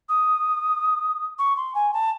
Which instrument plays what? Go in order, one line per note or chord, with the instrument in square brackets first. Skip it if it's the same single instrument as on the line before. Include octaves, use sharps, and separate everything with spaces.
[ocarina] D#6
C#6
C6
G#5
A5